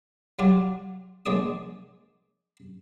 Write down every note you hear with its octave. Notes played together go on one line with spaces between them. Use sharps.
F#3 G3 F4 F#4 D5
A#1 G#3 C#5 D5 D#6